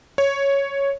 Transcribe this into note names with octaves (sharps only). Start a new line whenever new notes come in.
C#5